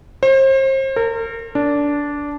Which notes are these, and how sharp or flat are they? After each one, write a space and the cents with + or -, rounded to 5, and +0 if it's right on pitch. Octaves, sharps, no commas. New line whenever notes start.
C5 +35
A#4 -35
D4 -15